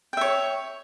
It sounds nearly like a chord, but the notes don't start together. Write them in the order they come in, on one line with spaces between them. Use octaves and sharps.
G5 E5 C#5